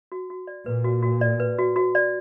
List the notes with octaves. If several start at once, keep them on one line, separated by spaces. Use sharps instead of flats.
F#4
F#4
D5
A#2 B4
F#4
F#4
D5
B4
F#4
F#4
D5